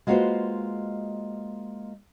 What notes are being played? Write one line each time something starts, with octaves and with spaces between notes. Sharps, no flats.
G#3 A#3 F4 F#4 B4 C5